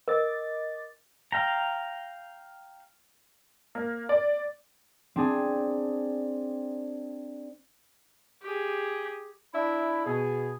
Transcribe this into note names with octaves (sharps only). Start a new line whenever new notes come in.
A#4 D#5 D6 A6
F5 G5 A#5
A#3
D5
C4 D4 G#4
G4 G#4
D4 E4 E5 B5
B2 G#4